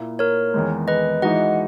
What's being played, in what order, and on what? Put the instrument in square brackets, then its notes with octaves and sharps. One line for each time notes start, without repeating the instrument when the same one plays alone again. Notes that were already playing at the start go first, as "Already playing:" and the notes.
Already playing: [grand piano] A#2 A#3 E4
[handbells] A#4 C#5
[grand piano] E2 D#3 G#3
[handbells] B4 D#5
[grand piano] E3 G#3 D#4 F#4 [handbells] D#5 F#5